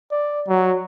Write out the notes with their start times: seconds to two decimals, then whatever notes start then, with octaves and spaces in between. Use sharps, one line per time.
0.11 D5
0.48 F#3